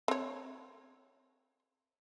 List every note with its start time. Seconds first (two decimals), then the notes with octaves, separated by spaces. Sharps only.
0.08 C4 C#5